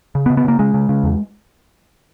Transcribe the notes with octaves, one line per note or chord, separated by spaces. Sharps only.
C#3
B3
C#3
B3
C#3 A#3
C#3 G#3
C#3
C#3
E2